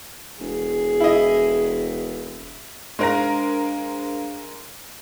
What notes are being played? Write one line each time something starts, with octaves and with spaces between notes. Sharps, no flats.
E1 G#4
E4 D#5
G#3 D4 A#4 C5 F5 A#6